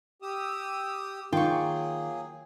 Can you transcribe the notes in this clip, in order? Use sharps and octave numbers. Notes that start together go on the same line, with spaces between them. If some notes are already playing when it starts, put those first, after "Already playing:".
G4 D#6 E6
D#3 F#3 A#3 F4 G#4 G5 C#6